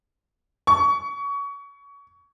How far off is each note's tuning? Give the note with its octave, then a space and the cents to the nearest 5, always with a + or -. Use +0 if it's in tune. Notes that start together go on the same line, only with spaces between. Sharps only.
C#6 +25